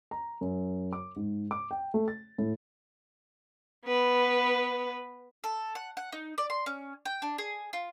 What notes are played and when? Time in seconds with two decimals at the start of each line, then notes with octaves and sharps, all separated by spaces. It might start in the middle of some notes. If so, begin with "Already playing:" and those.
0.11 A#5
0.41 F#2
0.93 D6
1.16 G#2
1.51 D6
1.71 G5
1.94 A3
2.08 A6
2.38 A2
3.86 B3 B4
5.44 A4
5.75 F#5
5.97 F#5
6.12 D#4
6.38 D5
6.50 C6
6.66 C#4
7.05 G5
7.22 D4
7.38 G#4
7.73 F4